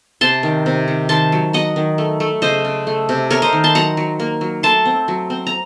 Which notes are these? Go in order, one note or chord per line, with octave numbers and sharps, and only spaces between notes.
C3 A5 C6
D#3
C3
D#3
D#3 A5 C6
F#3
F#3 D#5 F#5
D#3
A3
A3
C#3 C5 D#5
C#3
A3
C3
A3 A#4 C#5
C5 D#5
D#3
A5 C6
F#3 F#5 A#5
F#3
A#3
F#3
A3 A5 C6
C4
F#3
C4
A#5